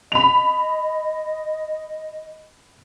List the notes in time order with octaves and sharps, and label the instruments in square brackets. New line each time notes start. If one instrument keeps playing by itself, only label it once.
[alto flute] D#5 [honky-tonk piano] B5 F7